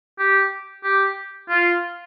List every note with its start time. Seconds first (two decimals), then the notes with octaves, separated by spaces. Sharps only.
0.19 G4
0.84 G4
1.50 F4